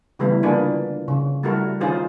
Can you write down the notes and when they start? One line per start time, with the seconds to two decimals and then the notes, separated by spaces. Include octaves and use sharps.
0.19 C#3 E3 G3 A3 B3 E4
0.43 D3 A#3 D4 F4 G#4 B4
1.08 C#3
1.43 G3 A3 E4 F#4 A4 A#4
1.80 D#3 C#4 D#4 F4 G#4 C5